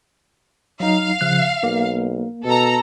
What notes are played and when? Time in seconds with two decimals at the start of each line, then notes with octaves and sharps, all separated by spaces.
0.80 F#3 D#4 F5
1.21 C#3 F3 F#6
1.63 B1 A#3
2.45 B2 A4 A#5